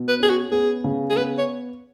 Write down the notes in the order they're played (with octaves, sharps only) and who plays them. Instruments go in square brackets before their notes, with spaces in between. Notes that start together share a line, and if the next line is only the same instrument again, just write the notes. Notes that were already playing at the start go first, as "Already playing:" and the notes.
Already playing: [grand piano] B2
[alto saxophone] B4
[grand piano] C#4 [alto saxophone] G#4
[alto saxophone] F#4
[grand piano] B3 [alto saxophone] G#4
[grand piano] C#3
[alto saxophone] G#4
[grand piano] B3 [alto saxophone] B4
[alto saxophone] C#5